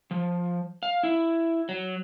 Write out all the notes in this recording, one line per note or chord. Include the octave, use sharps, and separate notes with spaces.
F3
F5
E4
F#3